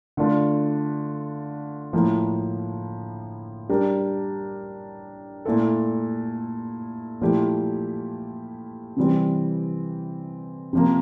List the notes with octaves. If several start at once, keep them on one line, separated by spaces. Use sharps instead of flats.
D3 A3 D4 F4
A2 F3 A#3 E4
G3 D4 G4 A#4
A#2 A3 E4 A4
A#2 F3 A3 E4 G4
C3 E3 G3 C4
C3 F3 A#3